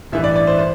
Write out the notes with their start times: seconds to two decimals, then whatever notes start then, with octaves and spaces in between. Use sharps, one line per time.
0.12 A1 G2 E3 E5
0.24 D5
0.36 D5
0.47 C5
0.59 C5